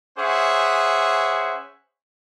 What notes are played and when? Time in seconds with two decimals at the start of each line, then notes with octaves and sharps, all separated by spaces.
0.18 C#4 G#4 C5 E5 F#5 C#6